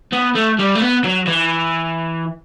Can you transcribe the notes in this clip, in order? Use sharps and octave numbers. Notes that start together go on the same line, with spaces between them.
B3
A3
G3
A3
B3
F#3
E3